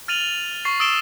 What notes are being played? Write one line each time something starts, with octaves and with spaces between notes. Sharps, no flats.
F6 A6 D#7 F7 F#7
C#6 A6 C7
D#6 E6 A6 D7 E7 G7